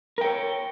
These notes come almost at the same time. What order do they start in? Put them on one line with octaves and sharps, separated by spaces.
A#4 G5 C#5